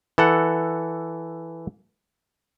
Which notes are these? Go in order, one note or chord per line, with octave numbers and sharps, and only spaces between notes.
E3 A4 F#5